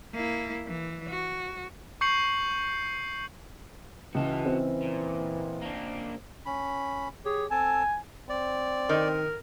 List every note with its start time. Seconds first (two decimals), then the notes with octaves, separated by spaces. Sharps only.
0.14 A#3 E4
0.67 E3
1.08 F#4
2.01 C#6 G6 C7 C#7 F#7
4.15 C#2 E3 F#4 A5
4.45 C4
4.82 A#2
5.62 A#3 D4
6.46 C#4 B5
7.25 G4 G#4 C#5
7.51 C4 A4 G#5 A5
8.30 C4 D5
8.89 D#3 A#4